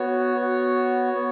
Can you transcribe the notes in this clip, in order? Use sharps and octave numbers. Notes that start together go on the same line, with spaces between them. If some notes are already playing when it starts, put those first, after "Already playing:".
Already playing: B3 F#4 C#5
B3 F#4
B3